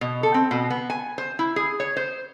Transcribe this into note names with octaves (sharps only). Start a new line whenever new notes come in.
B2
A4
C4
B2
B3
G#5
C5
E4
G#4
C#5
C5